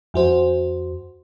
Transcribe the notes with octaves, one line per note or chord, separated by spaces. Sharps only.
F2 F#4 C5